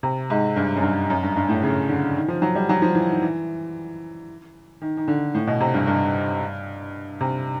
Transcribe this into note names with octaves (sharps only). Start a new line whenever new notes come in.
C3
G#2
G2
F#2
G2
F#2
G2
G2
A2
C#3
D3
D#3
F3
F#3
G3
F#3
F3
E3
D#3
E3
D#3
D#3
D3
A2
B2
C3
G2
G2
C3